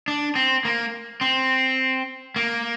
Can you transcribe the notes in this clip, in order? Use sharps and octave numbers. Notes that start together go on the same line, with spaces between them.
D4
C4
A#3
C4
A#3